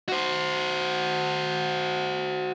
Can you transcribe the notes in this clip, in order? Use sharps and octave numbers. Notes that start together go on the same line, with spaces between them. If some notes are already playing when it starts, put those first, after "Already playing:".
F#4 C5